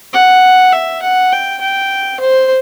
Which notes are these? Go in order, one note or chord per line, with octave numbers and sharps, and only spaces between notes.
F#5
E5
F#5
G5
G5
C5